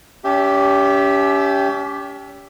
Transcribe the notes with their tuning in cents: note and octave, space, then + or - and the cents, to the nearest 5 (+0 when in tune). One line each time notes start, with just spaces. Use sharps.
C#4 +40 G4 +0 E5 +0